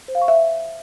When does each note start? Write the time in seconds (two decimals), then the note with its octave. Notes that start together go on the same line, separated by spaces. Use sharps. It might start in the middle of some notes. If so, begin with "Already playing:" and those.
0.08 C5
0.15 F5
0.22 C#6
0.28 E5